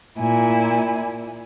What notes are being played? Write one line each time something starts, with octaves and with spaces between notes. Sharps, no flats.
A#2 E4 G#5